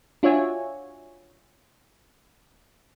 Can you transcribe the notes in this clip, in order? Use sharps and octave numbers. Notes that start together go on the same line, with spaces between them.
D4 F4 F#4 C#5 E5 G#5